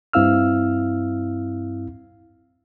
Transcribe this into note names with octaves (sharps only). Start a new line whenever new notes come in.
G2 C4 E4 F5 E6 F6